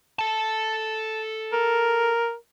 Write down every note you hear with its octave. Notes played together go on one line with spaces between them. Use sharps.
A4 A5
A#4